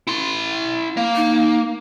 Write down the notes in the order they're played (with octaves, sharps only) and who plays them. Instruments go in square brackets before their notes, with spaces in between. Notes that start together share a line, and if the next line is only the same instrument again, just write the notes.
[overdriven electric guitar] E4 C6
A#3
[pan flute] D#4